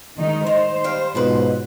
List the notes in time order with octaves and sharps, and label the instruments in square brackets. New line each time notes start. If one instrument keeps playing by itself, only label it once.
[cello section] D#3 G#3 D#4
[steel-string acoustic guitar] D#4 [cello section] C5
[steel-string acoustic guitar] G3 F5
[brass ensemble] G#2 B2 [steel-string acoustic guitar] F3 F#3 B4